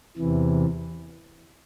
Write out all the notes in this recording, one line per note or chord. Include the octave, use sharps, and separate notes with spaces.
E2 C3 E3